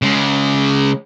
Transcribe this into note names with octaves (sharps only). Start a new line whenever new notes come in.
C#3 G#3